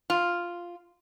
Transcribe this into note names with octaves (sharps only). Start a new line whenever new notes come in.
F4